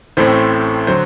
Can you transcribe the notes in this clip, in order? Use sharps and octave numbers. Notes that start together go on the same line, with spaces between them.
A1 A2 A3 C4 C5
D3 F#3 C5